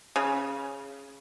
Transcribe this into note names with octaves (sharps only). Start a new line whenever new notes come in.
C#3